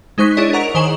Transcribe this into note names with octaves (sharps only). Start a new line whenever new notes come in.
G#3 D#4 C5 C#6 F#6 B6
D4 E4 G#4 C#5 D#5
A#4 F#5 A#5 C#6 D7 F7
D#3 C5 G#5 C#6 E7 F#7